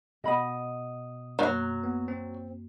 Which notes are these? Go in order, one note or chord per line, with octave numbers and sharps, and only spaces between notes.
B2 D#5 F#5 B5 D#6
F#2 D#3 F#3 A#3 F#6
B3
C4